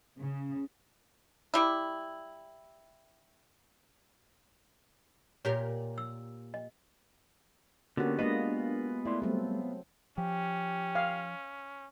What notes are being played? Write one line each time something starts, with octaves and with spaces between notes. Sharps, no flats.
C#3
G3 E4
A#2 G4 A#4 C#5
E6
D#5
D3 A#3 B3 C#4 F#4 G4 A#4
G#3 A#3 B3 D4 F4 B4 D#5
A3 E4 D5 C6
F#3 G3 A3 C4
F3 C#4 G4
F5